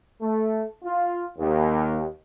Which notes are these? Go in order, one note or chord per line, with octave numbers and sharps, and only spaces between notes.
A3
F4
D#2